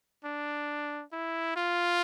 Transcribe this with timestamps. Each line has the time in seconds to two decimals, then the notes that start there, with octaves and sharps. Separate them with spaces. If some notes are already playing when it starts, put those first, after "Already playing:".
0.24 D4
1.12 E4
1.56 F4